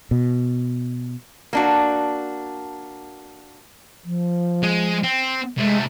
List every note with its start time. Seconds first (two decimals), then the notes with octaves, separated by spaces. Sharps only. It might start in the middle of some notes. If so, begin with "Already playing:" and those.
0.11 B2
1.53 A#3 D4 F#4
4.05 F3
4.63 G#3
5.03 C4
5.58 C3 G#3 A3